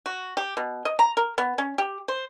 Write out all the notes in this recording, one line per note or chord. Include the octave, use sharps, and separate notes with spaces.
F#4
G4
B2
D#5
A#5
A#4
B3
C#4
G4
C5